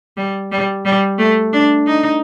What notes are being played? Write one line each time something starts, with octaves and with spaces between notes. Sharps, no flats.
G3
G3
G3
A3
D4
D#4